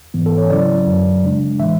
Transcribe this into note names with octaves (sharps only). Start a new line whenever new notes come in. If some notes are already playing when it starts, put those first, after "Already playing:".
G#2 E3 B3
A4
C#5
C#3 F#3 C#4 E4 D5
F#2 D3 F#3
C#3 G#3 D4
A2 E3 G#3 E5